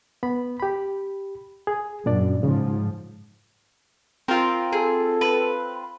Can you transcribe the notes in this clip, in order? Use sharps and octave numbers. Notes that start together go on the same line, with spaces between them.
B3 B5
G4 B5
G#4
F#2 A#2 D4 D5
G#2 C#3 F3
C4 F4 A#4
G#4 A4
B4